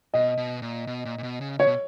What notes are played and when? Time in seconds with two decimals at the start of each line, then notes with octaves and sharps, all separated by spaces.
0.14 B2 D#5
0.37 B2
0.62 A#2
0.87 B2
1.05 A#2
1.18 A#2
1.23 B2
1.41 C#3
1.59 C#3 C#5
1.67 B2